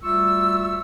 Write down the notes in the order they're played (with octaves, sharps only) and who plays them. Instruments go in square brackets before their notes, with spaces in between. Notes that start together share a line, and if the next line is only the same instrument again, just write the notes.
[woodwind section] D2 G3 F4 E5 C#6 E6